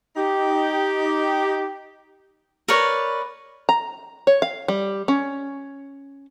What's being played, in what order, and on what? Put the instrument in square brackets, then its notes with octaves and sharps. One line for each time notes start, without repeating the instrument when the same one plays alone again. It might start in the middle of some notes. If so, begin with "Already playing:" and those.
[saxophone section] D#4 G4
[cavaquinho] A#4 B4 C#5 D5
[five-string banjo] A#5
C#5
F5
G3
C#4